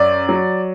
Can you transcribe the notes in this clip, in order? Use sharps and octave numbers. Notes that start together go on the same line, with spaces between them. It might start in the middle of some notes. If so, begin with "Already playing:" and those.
Already playing: F#2 D5
F#3